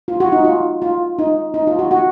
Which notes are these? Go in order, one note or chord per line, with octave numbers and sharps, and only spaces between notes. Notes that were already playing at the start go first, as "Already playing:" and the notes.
F4
F#4
D#4
F4
F4
D#4
D#4
F4
F#4
F#4